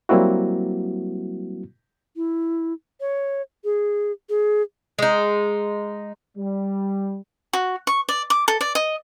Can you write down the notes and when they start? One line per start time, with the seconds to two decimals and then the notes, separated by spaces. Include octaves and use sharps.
0.09 F#3 G3 A#3 C4 E4 F#4
2.16 E4
3.01 C#5
3.64 G#4
4.29 G#4
4.99 G#3 D#4
6.37 G3
7.53 F#4
7.87 C#6
8.09 D5
8.30 D6
8.48 A4
8.61 D5
8.75 D#5